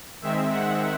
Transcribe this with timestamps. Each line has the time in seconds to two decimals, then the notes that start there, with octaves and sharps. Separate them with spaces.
0.22 D#3 G#3 C4 E5
0.52 F#5